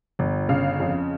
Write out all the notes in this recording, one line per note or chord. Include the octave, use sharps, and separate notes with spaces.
G1
C#3 F5
F2